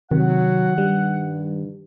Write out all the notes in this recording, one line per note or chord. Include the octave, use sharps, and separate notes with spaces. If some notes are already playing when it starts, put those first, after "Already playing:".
C3 D#3 F#3 F#5
G2 G3